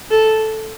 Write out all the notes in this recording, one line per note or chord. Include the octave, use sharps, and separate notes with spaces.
A4